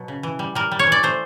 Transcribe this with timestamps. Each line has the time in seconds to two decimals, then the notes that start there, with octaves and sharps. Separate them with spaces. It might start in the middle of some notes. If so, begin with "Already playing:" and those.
Already playing: B2 F#3
0.08 C#3
0.23 E3
0.39 G3
0.55 G3 A#4
0.72 G3
0.79 C#5
0.87 E3
0.92 D5
1.03 A3 C5